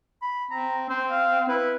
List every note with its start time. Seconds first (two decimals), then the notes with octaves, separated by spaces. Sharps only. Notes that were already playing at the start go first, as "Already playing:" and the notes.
0.22 B5
0.51 C4 A#5
0.89 C4 C5
1.11 F5
1.48 E4 B4